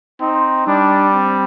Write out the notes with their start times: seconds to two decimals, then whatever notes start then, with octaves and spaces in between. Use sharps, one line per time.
0.21 C4 D#4
0.67 G3 D4
1.13 C4